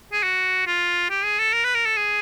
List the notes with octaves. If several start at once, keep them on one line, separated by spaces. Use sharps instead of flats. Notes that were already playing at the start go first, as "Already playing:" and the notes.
G#4
F#4
F4
G4
G#4
A4
A#4
B4
A#4
A4
G#4